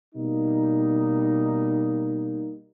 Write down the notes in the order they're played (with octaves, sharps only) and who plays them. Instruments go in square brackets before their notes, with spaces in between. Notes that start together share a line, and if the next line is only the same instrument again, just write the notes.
[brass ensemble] B2 G3 A#3 D#4